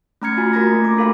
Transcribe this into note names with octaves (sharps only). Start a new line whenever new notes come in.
A3 C#4 A#5 F6 G#6 C#7
F4 F#4 G#5 A6
A3 F#4 A#4 A#5 G#6 A#6
A#3
A3 D6
D4 F#4 A4 A#4 F5 B5